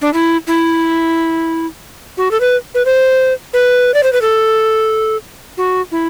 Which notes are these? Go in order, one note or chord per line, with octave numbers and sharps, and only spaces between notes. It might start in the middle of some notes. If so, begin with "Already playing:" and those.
D4
E4
E4
F#4
A4
B4
B4
C5
B4
D5
C5
B4
A4
F#4
E4